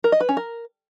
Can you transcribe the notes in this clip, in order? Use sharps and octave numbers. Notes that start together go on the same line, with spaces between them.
A#4
D#5
B4
C#4
A#4